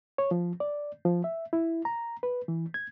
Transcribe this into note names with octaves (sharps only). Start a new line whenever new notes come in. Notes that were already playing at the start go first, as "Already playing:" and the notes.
C#5
F3
D5
F3
E5
E4
A#5
B4
E3
G#6